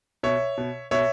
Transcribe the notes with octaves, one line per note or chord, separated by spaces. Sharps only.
B2 C#5 E5
B2
B2 C#5 E5